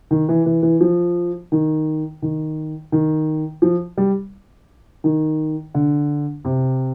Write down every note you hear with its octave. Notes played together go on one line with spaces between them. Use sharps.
D#3
E3
E3
E3
F3
D#3
D#3
D#3
F3
G3
D#3
D3
C3